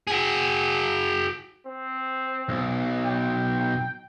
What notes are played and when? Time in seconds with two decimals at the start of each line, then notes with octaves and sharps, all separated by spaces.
0.07 F#4 G#4
1.66 C4
2.49 B1
3.05 G5